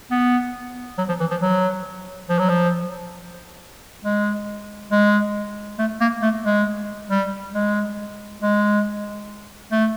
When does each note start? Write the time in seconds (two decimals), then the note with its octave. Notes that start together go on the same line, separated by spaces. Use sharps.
0.11 B3
0.98 F#3
1.09 F3
1.20 E3
1.31 F3
1.41 F#3
2.29 F3
2.39 F#3
2.49 F3
4.04 G#3
4.91 G#3
5.79 A3
6.01 A#3
6.22 A3
6.44 G#3
7.10 G3
7.54 G#3
8.41 G#3
9.72 A3